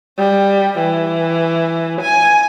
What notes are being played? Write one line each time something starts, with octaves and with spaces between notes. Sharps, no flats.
G3
E3
G#5